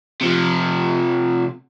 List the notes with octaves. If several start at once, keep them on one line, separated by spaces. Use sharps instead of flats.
C3 F3